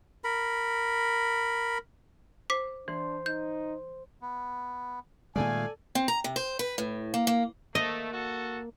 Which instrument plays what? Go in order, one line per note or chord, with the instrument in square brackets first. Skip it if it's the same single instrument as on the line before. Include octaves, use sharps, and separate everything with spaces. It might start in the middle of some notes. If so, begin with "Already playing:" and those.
[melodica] A#4 B5
[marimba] C5 [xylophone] D6 B6
[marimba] E3 [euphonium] D4 [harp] C5
[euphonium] D#4 [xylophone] G6
[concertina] B3
[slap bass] A#2 D#3 G#3 [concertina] A3 F5 [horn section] A4 D5 G#5
[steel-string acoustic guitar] C4
A#5
C3
C5
B4
A2
A#3
A#3
[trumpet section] A3 [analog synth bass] A#3 [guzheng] D#5
[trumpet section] F#4 A4